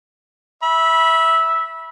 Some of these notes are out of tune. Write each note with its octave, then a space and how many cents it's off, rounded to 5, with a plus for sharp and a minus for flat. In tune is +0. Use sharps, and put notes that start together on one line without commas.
E5 -10 B5 -20